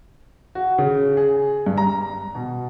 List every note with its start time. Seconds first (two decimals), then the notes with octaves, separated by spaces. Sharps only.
0.55 F#4
0.78 C#3
1.17 G#4
1.66 G2
1.78 A#5
2.35 B2